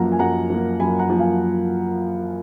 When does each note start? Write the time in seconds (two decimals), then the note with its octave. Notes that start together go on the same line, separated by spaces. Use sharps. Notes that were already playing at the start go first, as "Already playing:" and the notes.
Already playing: F#2 F3 A#3 F#5 A#5
0.12 G#5
0.19 F#2 F#5 A#5
0.50 F3 A#3
0.80 F#2 G#5 B5
0.99 F#5 A#5
1.10 F3 A#3
1.19 F5 G#5